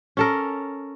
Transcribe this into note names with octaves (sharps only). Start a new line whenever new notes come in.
C#4 A4 A#4